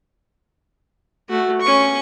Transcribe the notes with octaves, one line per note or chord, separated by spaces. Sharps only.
A3 F#4
C#4 C#6